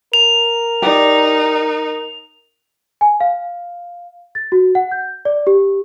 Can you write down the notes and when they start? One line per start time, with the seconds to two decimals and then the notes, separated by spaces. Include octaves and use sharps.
0.13 A#4 F7
0.82 D#4 G4 D5
3.01 G#5
3.21 F5
4.35 A6
4.52 F#4
4.75 F#5
4.91 G6
5.25 D5
5.47 G4